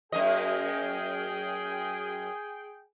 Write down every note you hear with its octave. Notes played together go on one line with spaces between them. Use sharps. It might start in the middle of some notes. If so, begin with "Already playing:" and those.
F#2 A#3 G#4 D#5 G5